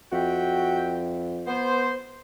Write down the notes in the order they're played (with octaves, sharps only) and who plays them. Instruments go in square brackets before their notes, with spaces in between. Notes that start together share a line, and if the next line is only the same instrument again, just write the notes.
[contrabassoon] F2 [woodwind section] F#4 E5 G5
[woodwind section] B3 C5